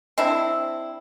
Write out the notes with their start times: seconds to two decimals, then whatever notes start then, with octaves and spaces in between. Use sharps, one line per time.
0.18 C4 D4 E4